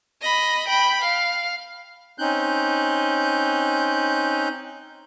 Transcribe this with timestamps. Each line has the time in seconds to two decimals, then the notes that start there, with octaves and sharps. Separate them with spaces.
0.21 D#5 B5
0.68 G5 B5
1.01 F5
2.18 C4 C#4 D#4 F#6 G6